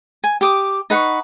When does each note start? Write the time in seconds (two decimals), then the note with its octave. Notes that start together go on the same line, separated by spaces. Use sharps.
0.24 G#5
0.41 G4 D6 D#6
0.90 D#4 B4 F#5 C#6